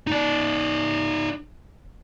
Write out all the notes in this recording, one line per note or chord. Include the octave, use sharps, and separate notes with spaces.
D#4 D5